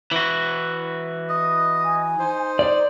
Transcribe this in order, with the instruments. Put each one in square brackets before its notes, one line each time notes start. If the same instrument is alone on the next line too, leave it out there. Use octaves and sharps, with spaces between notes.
[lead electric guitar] E3 F#4
[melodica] D#5
[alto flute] G#5
[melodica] D#4 C5
[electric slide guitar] D5